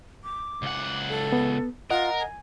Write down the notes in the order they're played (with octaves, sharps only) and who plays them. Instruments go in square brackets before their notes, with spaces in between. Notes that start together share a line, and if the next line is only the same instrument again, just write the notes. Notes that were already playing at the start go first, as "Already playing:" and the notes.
[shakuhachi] D6
[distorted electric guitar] C#2 F#5
[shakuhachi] A4
[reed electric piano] B3
[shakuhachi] F4 [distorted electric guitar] A#4 [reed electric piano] D#5 F#5
[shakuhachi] G#5